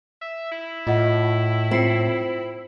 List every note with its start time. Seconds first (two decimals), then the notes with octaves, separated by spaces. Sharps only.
0.21 E5
0.51 E4
0.87 A2 F4 D#5 F#5
1.71 C4 F4 C7 C#7